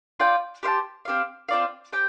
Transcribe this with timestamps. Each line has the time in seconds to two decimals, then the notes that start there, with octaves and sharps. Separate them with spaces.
0.20 F4 D5 G5
0.63 G4 C5 F5 A5
1.05 C4 G4 F5
1.49 C4 F4 D5 F5
1.93 G4 C5 G5